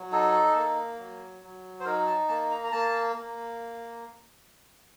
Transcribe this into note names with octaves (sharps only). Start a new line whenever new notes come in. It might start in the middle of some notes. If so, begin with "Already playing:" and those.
Already playing: F#3
D#4 A4
A#3
F#3
F#3
C5
D#4 A#4
A5
A#3 A5
A#5
A#5
A#3 A5
A#3